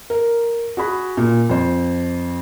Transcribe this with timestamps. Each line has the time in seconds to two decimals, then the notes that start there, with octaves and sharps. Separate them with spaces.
0.10 A#4
0.77 F#4 G#4 B5
1.17 A#2
1.50 F2 C5